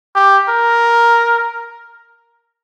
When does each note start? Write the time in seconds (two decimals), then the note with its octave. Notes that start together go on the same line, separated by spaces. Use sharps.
0.15 G4
0.49 A#4